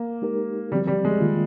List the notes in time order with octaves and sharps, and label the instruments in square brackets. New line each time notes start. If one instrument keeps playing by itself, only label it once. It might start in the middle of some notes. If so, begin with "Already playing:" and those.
Already playing: [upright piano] A#3
[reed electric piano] G#3 D#4 G4 A#4
[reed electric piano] D3 F3 C4 [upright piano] G3
[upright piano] G3
G#3
[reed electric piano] D#3 A#3 F4